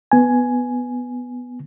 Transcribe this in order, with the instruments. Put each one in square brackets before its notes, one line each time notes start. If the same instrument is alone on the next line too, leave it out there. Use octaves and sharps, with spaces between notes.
[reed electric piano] B3 G#5